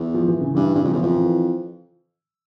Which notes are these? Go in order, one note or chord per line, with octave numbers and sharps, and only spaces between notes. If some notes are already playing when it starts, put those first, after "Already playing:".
Already playing: E2
F3
E3
C#3
G2 E3
G2 C#3
F2
E2 E3 F3
F2
E3